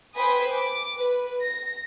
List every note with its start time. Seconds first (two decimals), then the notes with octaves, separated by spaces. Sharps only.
0.15 B4 C5 G5 G#5 B5 D#6
0.54 D6
0.98 B4
1.41 A#6